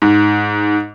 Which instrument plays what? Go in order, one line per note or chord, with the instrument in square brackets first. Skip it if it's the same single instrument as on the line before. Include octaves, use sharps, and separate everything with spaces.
[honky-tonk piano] G#2